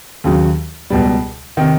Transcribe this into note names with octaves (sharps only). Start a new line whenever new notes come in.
D#2 C#3 F#3
C#2 B2 G3
C3 D#3